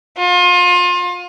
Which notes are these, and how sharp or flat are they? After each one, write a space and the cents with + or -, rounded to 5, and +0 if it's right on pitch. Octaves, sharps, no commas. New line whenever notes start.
F4 +30